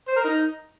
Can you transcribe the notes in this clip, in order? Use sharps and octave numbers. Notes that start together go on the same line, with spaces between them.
C5
A#4
D#4